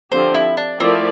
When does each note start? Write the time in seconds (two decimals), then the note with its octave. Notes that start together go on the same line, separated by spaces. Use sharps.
0.12 D3 F3 C4 G4 C5
0.34 E4
0.57 D4
0.80 F3 A3 C4 E4 A#4 D5